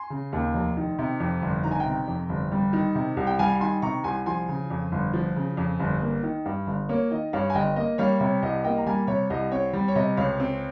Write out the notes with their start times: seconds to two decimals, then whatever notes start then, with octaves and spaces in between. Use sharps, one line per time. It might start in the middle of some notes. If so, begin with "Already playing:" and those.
Already playing: G#5 C6
0.10 C#3
0.33 D#2
0.54 F1
0.77 D#3
0.99 C3
1.20 F2
1.42 G1
1.64 D#3 A#5
1.71 G#5
1.80 G5 A#5
1.85 C3
2.08 F2
2.29 G1
2.51 G3
2.73 D#3
2.95 C3
3.17 C2
3.27 G5
3.39 G3 F5 G#5
3.60 D#3 G#5 C6
3.82 C3 A#5 C#6
4.04 C2 G#5 C6
4.26 F3 G#5 C6
4.49 C#3
4.70 F2
4.92 G1
5.13 F3
5.36 C#3
5.57 F2
5.80 G1
6.02 A#3
6.23 D#3
6.45 G2
6.67 G1
6.89 A#3 C#5
7.11 D#3 D#5
7.33 G2 C#5 F5
7.50 G#5
7.55 G1 D#5 G5
7.76 A#3 D#5
7.98 G3 C#5 F5
8.20 C3 C#5
8.42 C2 D#5
8.64 A#3 D#5 G5
8.77 A#5
8.86 G3 F5 G#5
9.07 C3 C#5
9.30 C2 D#5
9.51 C4 C#5
9.73 G3
9.88 C#5
9.95 C3 D#5
10.17 C#2 C#5 F5
10.40 C4